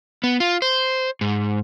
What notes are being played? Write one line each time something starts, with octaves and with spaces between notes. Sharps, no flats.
B3
F4
C5
G#2